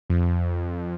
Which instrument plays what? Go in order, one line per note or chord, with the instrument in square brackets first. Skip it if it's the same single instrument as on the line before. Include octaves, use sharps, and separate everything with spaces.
[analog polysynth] F2